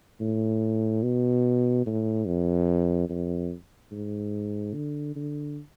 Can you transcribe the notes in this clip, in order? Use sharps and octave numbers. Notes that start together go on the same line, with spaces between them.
A2
B2
A2
F2
F2
G#2
D3
D3